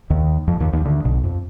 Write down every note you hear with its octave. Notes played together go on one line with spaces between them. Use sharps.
D#2 D#3
F2 F3
D#2 D#3
D#2 D#3
D2 D3
B1 B2
F2